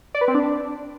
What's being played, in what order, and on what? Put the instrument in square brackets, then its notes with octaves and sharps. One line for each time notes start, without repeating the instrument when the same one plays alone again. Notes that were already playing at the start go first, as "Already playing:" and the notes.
[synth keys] D5
B4
C4
D4